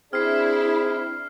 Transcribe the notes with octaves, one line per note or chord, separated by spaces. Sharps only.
C4 D4 E4 G#4 F6 C7